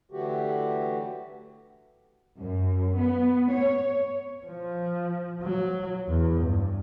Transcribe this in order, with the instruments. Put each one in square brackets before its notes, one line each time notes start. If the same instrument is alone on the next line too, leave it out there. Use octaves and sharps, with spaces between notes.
[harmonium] D3 E3 F#3 A3 F#4 G4
[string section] F#2
B3
C#5
[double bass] F3
F#3
E2
G2